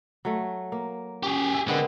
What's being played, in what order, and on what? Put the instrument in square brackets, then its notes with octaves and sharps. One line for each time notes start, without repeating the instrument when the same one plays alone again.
[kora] F#3 A3
A#3
[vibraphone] C#4 [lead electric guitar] G4 G#4
[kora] E5
[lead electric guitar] D3 [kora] G#3 B3 C4 [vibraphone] A#4